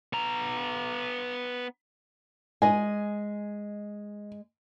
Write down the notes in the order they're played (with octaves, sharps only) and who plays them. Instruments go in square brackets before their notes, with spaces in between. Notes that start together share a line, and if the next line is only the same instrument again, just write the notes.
[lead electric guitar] B3 A#5
[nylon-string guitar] G#3 D#5 [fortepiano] G#5